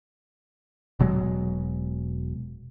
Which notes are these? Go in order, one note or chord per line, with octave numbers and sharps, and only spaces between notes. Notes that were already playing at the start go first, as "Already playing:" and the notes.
E1 B2 F#3 G#3